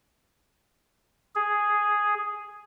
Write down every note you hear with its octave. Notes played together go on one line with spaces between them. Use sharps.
G#4